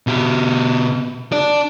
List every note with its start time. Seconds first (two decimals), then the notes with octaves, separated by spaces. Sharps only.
0.07 B2 G4
1.32 D4 D5